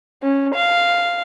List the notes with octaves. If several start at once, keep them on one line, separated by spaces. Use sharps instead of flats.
C#4
F5